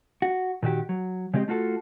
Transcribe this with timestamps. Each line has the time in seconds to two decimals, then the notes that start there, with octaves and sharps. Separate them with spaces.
0.22 F#4
0.63 A#2 D#3 F#4 G4
0.89 F#3
1.34 C#3 G#3 C4 G4 D#5
1.48 A3 F4 F#4 A4